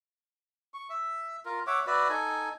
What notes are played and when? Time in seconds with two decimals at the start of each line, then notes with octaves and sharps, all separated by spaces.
0.74 C#6
0.90 E5
1.46 F4 A#4
1.67 C#5 E5 F#5 D6
1.87 F#4 B4 D5 E5
2.09 D#4 A4 G#5